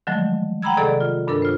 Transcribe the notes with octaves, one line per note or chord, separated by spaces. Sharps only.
D3 D#3 F3 F#3 G#3 A3
F#5 G5 A#5 B5 E6 G#6
C3 D#3 G#4 A4 D5 G#5
F4
G2 D4 A4 A#4 E6
F4 C5